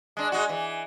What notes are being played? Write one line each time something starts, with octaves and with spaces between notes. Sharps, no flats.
G#3 D4
G#3 D#4 F#4
E3